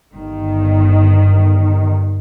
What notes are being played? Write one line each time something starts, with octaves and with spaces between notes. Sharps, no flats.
G1 G2 D#3